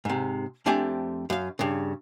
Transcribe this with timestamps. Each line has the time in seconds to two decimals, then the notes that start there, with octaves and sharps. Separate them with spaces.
0.05 G#2 C3
0.66 F2 A3 C4 D4 G4 G#5
1.30 F#2 F5
1.59 G2 C#3